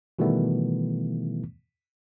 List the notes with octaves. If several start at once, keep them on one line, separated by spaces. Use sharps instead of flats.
B2 D#3 E3 G3 A3 B3